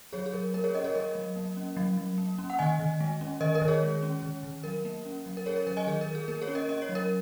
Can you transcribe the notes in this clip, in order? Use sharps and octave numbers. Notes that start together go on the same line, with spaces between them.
F#3 G#4 C#5
G#4
F#3 A#4
A#3 A#4
G#4 C#5
C#4 A#4 D#5
G#4 C#5
F#3 A#4 D#5
F#3
A#3
C#4
F#3
F#3
A#3
C#4
F#5
D#3 D#5 G#5
D#3
G#3
C#4
D#3 A#4 D#5
A#4 D#5
D#3
G#4 C#5
G#3
C#4
D#3
D#3
F#3 A#4
A#3
C#4
F#3
A#4
C#4 G#4 C#5
A#4
F#3 A#4
D#5 G#5
D#3 G#4
A#4
D#3
G#4
A#3 A#4
G#4 C#5
C#4
A#4 D#5
C#4 D#5
C#5
F#3
A#4